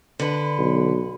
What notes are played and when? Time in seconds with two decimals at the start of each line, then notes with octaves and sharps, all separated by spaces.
0.19 D3 B4
0.59 B1